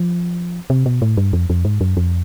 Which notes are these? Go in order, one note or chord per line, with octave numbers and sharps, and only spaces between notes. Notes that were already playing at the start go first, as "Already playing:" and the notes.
Already playing: F3
C3
B2
A2
G2
F2
F2
G#2
F#2
F2